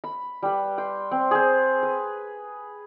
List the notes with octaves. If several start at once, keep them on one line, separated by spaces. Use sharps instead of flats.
B5
G3 B4
G5 C6
C4
G#4 C5
B4